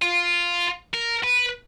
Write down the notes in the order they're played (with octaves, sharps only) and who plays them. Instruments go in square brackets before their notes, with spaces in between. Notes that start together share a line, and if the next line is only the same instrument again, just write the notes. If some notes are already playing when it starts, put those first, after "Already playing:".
[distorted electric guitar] F4
A#4
B4